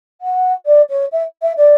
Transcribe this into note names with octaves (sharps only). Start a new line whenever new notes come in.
F#5
D5
C#5
E5
E5
D5